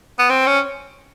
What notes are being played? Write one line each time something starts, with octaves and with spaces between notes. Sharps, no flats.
B3
C4
C#4